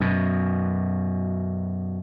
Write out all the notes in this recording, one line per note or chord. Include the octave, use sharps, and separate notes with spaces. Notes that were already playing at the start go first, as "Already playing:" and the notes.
F#2 B2